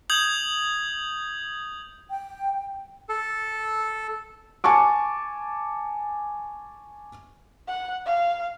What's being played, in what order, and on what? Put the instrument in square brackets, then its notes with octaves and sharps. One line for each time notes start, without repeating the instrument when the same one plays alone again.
[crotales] D#6 G6 G#6 F#7
[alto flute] G5
[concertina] A4
[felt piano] G#5 A5 C#6 D6
[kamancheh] F#5
F5